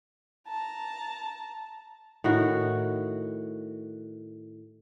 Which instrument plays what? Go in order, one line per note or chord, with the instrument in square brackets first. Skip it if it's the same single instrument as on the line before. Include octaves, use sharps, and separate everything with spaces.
[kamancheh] A5 A#5
[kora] A2 D#3 F#4